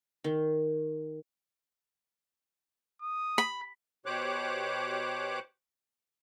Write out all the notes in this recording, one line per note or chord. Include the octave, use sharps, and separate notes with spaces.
D#3
D#6
B5
B2 G4 C5 C#5 D6 F#6